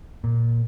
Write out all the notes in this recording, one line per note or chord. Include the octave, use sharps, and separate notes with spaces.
A#2